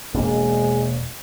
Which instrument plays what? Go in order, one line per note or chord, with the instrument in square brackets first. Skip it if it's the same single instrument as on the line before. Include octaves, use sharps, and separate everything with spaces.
[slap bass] E1 A#3 [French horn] G#3